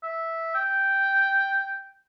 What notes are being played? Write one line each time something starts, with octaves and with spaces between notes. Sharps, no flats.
E5
G5